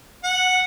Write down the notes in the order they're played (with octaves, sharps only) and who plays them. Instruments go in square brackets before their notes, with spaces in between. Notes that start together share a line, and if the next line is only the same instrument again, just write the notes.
[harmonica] F#5